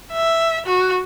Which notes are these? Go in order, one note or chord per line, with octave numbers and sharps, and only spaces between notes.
E5
F#4